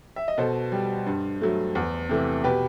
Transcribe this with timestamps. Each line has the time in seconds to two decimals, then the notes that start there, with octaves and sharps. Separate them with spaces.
0.16 E5
0.28 D#5
0.38 B2 A4 C5
0.72 G3
1.06 G2
1.41 F#3 A3
1.75 E2
2.09 C3 E3 A3
2.44 B2 G4 B4